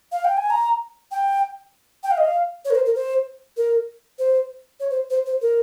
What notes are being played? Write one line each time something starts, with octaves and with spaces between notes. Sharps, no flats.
F5
G5
G#5
A#5
G5
G5
F5
D#5
F5
C#5
A#4
C5
A#4
C5
A#4
C5
C#5
C5
C5
C5
A#4